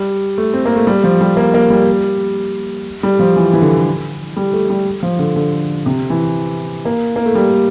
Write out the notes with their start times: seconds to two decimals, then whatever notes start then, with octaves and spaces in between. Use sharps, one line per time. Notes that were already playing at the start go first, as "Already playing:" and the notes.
Already playing: G3
0.38 A3
0.54 C4
0.65 A#3
0.76 A3
0.87 G3
1.04 F3
1.21 G3
1.37 A#3
1.54 A#3
1.70 G3
3.03 G3
3.19 F3
3.36 E3
3.53 E3
3.62 D3
4.37 G3
4.53 A3
4.70 G3
5.03 F3
5.19 D3
5.36 D3
5.86 C3
6.10 E3
6.85 A#3
7.16 A#3
7.26 A3
7.35 G3